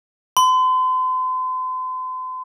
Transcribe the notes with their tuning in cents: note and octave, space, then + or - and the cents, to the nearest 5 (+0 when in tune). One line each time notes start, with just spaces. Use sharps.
C6 -40